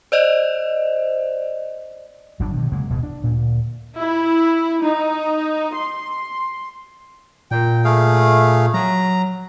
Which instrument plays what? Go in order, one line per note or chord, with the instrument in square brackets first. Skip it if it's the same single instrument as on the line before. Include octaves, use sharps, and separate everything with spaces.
[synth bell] C5 D5 D#5
[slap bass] G1 F#3 G3 D4
G2 B2 D#3
C#3 F#3 G#3 A#3
D1 B2
D4
D2 A#2
[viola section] E4
D#4
C6
[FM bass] A#2 [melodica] G5
[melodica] A3 G#4 F5
[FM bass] F#3 [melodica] A#5